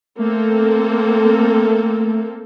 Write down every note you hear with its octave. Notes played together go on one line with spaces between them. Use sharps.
A3 A#3 C4 A4